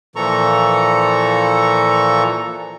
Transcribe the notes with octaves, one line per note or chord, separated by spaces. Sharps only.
A#2 E3 F3 A4 A#5 C#6